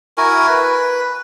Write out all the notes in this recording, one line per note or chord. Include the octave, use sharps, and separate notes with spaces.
E4 F#4 A#4 G#5
B4